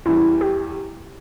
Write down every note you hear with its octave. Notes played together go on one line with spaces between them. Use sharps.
E2 E3 G3 E4
G4